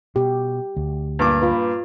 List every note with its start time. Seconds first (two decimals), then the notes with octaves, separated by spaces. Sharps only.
0.16 B2 G4
0.76 D2
1.19 G2 A#2 D6
1.42 F4 B4